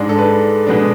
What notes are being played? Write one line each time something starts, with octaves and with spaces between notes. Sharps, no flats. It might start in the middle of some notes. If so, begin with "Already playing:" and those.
Already playing: G#2 G#3 D4 D5
A4
B4
B2 G#3 B3 D4